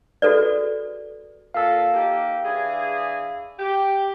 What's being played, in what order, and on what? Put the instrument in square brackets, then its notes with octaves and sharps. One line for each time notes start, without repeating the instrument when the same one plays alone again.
[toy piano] F#4 G#4 A4 B4 D5
[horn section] A#2 A4 [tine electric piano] F5 E6
[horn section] A#3 D#4 G4
E3 D4 G#4
G4